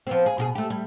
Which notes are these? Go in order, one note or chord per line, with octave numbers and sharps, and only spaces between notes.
F3 B3 C4
G#4
B2 G4 G#4
A3 G4
G3